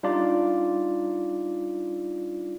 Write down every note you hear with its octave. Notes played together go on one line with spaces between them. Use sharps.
G3 D4 D#4 F4 D5